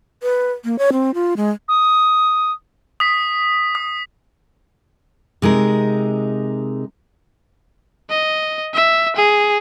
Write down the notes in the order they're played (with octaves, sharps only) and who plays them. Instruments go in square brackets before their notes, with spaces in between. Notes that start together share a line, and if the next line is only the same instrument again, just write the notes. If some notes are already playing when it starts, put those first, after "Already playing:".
[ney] B4
A#3
C#5
C4
F4
G#3
[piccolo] D#6
[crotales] D#6 B6
D#6
[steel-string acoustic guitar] C3 G#3 D#4 A#4
[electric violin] D#5
E5
G#4